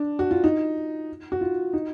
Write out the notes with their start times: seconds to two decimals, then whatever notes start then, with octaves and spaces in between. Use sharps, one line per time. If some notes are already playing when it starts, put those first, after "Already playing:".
Already playing: D4
0.19 F#4
0.31 F4
0.44 D#4
1.32 F#4
1.41 F4
1.73 D#4